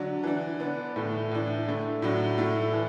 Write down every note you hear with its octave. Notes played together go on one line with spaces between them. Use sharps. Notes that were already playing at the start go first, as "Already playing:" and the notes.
Already playing: D3 F#3 D4
E3 D4
D3 B3 D4
A2 E3 A3
A2 E3 D4
D3 A3 E4
A2 F#3 D4
A2 A3 E4
E3